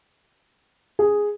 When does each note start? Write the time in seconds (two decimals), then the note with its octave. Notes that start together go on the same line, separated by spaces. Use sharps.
0.99 G#4